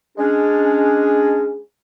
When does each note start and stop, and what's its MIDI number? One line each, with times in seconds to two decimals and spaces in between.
0.18 1.58 56
0.18 1.58 61
0.18 1.58 62
0.18 1.61 68